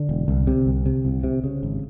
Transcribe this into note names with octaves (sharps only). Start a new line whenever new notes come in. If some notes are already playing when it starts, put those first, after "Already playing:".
Already playing: D3 D4
E1
C2
C3
C2
C3
C2
C3
C#3
G#1